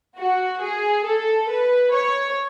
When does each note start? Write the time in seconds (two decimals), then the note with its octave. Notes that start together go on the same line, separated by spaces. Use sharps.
0.18 F#4
0.61 G#4
1.05 A4
1.49 B4
1.93 C#5